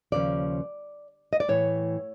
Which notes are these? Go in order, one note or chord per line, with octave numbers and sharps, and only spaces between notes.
D#2 C#3 F3 D5
D#5
D5
A2 E3 C#5